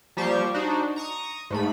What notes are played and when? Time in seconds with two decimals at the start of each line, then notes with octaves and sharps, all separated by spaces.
0.17 F3 G3 A#3 G4 C5 C#6
0.54 D4 D#4 F#4 C5
0.96 A#5 C#6 D#6
1.50 G#2 A3 B5